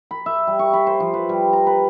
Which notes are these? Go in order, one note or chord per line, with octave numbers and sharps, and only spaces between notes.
B5
E5
G3
C#6
B5
C5
F3
B4
G3
A#5
B4